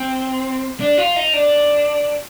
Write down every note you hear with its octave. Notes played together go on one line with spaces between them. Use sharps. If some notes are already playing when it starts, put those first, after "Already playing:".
Already playing: C4
D4
F4
D#4
D4